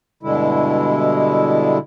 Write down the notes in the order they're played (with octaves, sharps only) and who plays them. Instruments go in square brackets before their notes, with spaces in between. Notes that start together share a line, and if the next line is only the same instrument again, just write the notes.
[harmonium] G2 B2 D3 G#3 E4